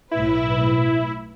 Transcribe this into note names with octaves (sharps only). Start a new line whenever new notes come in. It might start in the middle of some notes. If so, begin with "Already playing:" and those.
B1 A2 E4 B4